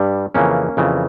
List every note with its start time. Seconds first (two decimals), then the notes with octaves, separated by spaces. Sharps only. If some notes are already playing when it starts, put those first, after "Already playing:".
Already playing: G2 G3
0.34 F2 C#3 E3 A#3 C#4
0.77 F2 C#3 E3